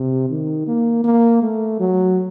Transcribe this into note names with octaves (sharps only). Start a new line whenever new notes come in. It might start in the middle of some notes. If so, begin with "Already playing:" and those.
Already playing: C3
D#3
A#3
A#3
A3
F#3